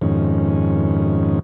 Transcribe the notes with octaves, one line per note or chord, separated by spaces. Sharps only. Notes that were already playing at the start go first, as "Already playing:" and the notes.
F2 G#2 D#3 C#4